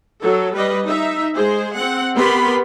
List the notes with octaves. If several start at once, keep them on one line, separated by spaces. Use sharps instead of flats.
F#3 A4
G3 B4 D#5
D#4 E5
G#3 G#4 C5
C4 F#5
B3 G4 A#4 B4 B5 C6